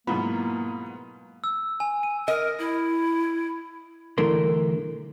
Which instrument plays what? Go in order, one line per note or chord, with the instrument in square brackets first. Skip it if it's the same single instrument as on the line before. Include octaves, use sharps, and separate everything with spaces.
[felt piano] G#2 B3 [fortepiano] B2 B5 [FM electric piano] F#3 E4 F4 [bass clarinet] A#3
[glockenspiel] E6
G#5
D#7
[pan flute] A#4 [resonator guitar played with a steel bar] D#5
[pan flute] E4
[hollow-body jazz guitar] B1 D3 E3 A3 A#4 C6